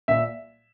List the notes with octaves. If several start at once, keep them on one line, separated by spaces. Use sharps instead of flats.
A#2 E5